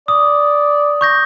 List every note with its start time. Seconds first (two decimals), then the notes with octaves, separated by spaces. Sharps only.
0.08 D5 D#6
1.01 C#6 G6 A#6